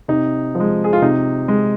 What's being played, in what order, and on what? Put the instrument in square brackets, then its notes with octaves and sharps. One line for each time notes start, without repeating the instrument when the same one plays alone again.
[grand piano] C3 D#4
F3
G#3
G#4
F4
C3 D#4
G#3